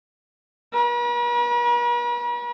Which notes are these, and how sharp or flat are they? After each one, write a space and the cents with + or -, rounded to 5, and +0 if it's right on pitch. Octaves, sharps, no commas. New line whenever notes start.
B4 -45